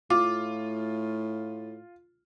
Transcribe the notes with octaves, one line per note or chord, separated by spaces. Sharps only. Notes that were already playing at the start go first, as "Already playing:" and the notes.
A2 F4 D6